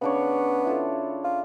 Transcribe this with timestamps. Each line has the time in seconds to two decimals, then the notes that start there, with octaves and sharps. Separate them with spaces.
0.02 C#3 B3 D4 C#5
0.65 E4 F4 A4
1.24 F4